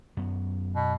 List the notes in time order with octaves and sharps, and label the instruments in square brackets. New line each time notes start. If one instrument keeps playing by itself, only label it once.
[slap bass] F#2 B3
[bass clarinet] B2